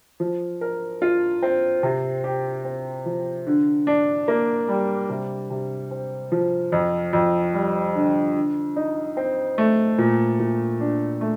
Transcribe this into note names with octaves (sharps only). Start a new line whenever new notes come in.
F3
A#4
F4
C4
C3
G4
C4
F3
D3
D4
A#3
G3
C3
C3
C4
F3
F2
F2
G3
D3
D3
D#4
C4
A3
A#2
A#2
D4
A3